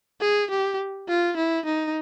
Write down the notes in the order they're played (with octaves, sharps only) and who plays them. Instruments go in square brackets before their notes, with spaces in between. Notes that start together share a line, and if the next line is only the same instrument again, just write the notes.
[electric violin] G#4
G4
F4
E4
D#4